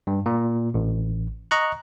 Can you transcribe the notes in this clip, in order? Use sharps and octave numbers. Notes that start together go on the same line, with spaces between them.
G2
A#2
A1
D#5 A#5 C#6 F#6